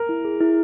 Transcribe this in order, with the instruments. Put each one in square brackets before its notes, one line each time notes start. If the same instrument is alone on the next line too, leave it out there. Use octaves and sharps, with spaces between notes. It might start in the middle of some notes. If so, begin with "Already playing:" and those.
Already playing: [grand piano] A#4
[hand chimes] E4
G#4
E4